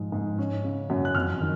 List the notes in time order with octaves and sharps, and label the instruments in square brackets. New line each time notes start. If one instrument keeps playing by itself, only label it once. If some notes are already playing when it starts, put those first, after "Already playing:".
Already playing: [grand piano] G#2 F3
G#2
C#4
C#3
F#2
F#6
F2 F6
D#3